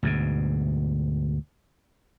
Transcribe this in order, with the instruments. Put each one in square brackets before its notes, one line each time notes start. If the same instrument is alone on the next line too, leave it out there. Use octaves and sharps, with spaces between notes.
[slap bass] D2 G#2 B2